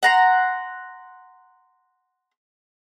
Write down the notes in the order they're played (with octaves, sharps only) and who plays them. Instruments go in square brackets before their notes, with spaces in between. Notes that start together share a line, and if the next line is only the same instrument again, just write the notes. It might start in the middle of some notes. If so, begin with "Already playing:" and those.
[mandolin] F#5 A#5 C6